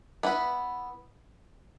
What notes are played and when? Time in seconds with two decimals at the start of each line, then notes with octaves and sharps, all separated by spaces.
0.23 B3 E4 B4